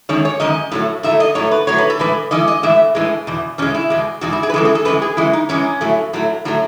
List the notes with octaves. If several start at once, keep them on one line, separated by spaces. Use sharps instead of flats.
F#2 D#3 G#3 C#5
C#5
F#2 D#3 G#3 D#5
A2 F#3 A3
A2 F#3 A3 E5
D#5
A2 F#3 A3 C#5
B4
A2 F#3 A3 C#5
B4
A4
A2 E3 G#3 B4
A2 E3 G#3 D#5
D#5
A2 E3 G#3 E5
A2 E3 G#3
E2 B2
E2 B2 G#3 C#4
E4
E2 B2 G#3
E2 B2 G#3 F#4
E4
G#4
B4
F#2 E3 G#3 A4
G#4
A4
F#2 E3 G#3 B4
G#4
F#2 E3 G#3 E4
D#4
F#2 E3 G#3 C#4
A2 F#3 A3
A2 F#3 A3
A2 F#3 A3